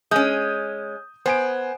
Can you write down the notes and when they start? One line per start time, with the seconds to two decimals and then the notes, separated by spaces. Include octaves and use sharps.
0.11 G#3 C#4 D#6 G6
1.26 B3 C5 G#5 D7